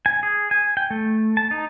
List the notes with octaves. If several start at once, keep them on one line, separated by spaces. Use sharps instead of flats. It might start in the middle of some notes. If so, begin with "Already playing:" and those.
G#5
G#4
G#5
G5
A3
A5
D#4